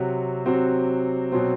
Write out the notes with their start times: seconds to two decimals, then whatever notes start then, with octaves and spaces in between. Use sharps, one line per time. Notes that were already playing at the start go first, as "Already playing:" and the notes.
Already playing: C3 F#3 C4 F#4
0.45 C3 F#3 C4 F#4
1.32 B2 F#3 C4